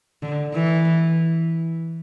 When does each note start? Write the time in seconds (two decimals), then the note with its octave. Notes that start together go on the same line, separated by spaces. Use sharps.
0.23 D3
0.54 E3